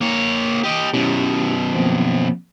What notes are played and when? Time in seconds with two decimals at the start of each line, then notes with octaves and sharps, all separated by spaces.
0.01 A#3 C#5
0.63 G4 D#5
0.94 F#2 B2 C#4 E4 G4
1.74 F3 A#3 C4